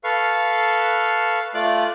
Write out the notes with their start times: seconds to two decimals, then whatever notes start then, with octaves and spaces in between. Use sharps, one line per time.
0.04 A4 B4 F5 C#6
1.55 A3 F4 D5 D6 F#6